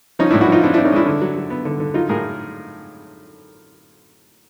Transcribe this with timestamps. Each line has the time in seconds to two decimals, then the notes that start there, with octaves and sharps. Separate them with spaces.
0.19 F3 C#4 D#4
0.31 D4 E4
0.34 A2
0.41 E4 F#4
0.48 F3 D#4 F4
0.63 C4 D4 E4
0.74 C4 D4 E4
0.85 C#4 D#4
0.92 G#3 D4 E4
1.06 D3
1.22 F#3
1.36 F#3
1.50 B3
1.65 D3
1.80 D3
1.94 F#3 D#4 F4
2.09 A2 G#4 A#4